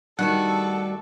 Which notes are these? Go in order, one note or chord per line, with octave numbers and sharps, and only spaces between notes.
G2 D#3 G3 A3 F#4 A4 F#5